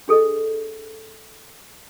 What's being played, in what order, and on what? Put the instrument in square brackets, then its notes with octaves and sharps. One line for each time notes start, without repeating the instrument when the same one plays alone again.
[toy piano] D4 G#4 A4 B4 D#5